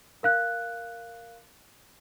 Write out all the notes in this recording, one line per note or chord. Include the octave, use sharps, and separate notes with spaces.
A#4 F5 F#6